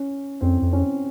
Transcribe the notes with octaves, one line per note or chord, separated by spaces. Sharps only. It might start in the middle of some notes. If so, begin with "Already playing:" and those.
Already playing: C#4
F2 C4
F2
C#4